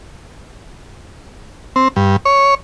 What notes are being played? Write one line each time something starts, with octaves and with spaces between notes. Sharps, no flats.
C4
G2
C#5